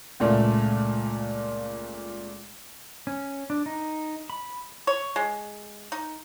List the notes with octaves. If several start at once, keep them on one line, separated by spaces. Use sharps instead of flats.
C#2 A#2 A3
C#4
D4
D#4
B5
C#5
G#3
D#4